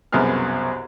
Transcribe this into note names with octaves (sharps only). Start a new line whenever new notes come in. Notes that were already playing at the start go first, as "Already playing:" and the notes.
C2 F#2 B2 B3 G#4 F6